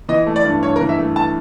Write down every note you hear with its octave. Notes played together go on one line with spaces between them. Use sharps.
E3 D#5
A3
D5
G2
G2 C#5
A#4
E3
E5
A3
A5